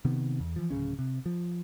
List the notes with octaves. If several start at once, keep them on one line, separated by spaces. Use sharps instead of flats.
C3 D#3 B3
E2
E3 F3
D1 G1 C#3 C#4
C3
F3